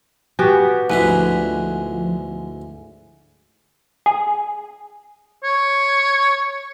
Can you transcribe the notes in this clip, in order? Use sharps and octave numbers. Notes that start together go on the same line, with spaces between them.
B3 F#4 G4 G#5
D2 G#2 D3 F3 E4 B4 G#5
G#4
C#5